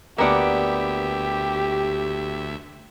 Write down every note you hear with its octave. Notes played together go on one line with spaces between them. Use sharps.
D2 A#3 B3 G4 D5 E5